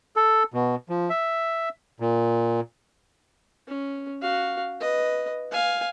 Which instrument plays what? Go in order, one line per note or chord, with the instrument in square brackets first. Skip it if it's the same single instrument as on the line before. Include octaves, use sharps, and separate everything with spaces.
[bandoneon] A4
B2
F3
E5
A#2
[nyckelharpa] C#4
F#4 F5
B4 D#5
F5 G#5